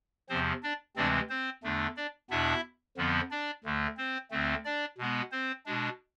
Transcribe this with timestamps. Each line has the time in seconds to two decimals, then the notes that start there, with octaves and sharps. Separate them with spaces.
0.29 E2 C3 F3 C4 C5
0.63 D4 D5
0.96 D2 C3 E3 G#3 C4 D4 D5
1.30 C4 C5
1.64 E2 D3 A3 D4
1.96 D4 D5
2.30 E2 B2 B3 D4 E4 E5
2.97 F2 D3 F3 B3
3.31 D4 D5
3.64 D2 D3 A3
3.97 C4 C5
4.31 D2 D3 A3 C4
4.64 D4 D5
4.98 B2 G#3 B3
5.32 C4 C5
5.66 B2 G#3 D4